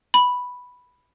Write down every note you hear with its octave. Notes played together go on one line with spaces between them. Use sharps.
B5